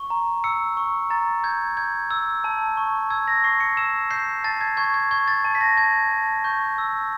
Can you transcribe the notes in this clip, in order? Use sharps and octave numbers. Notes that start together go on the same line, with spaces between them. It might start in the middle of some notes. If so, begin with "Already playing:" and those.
Already playing: C#6
A#5
E6 C#7
C#6
A#5 A6
G6 G#6
G6 G#6
E6
A5
C#6
E6 G#6
A#6
C#6 C7
C#7
E6 E7
G6 C7
A5 A6
G#6
C#6 G#6
G#6
C#6 G#6
A6
A5
B6
A#6
A5 G#6
A5
C#6 G6
E6